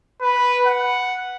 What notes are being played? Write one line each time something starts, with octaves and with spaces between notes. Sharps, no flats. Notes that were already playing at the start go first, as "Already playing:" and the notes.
B4
F#5